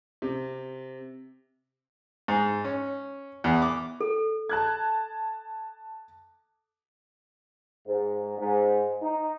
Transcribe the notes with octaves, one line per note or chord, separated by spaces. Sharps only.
C3
G#2
C#4
E2
D6
A4
A5 F#6 G#6
G#2
G#2
D#4